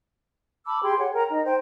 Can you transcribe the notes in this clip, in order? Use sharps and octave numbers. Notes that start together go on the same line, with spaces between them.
A5 B5 D6 E6
G4 G#4 G5 C6
G#4 C#5 F#5
A#4 G5 A#5
D#4 D#5
C5 G5